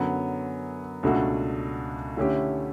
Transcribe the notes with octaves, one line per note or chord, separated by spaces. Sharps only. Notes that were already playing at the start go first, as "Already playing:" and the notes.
Already playing: F#2 D3 F#3 B3
C#2 B2 A3 D4 F#4
D3 A3 C#4 E4 G4